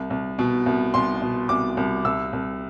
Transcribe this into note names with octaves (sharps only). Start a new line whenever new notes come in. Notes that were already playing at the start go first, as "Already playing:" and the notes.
Already playing: C2
C2
B2
C2
C2 C6
B2
C2 D6
C2
C2 E6
C2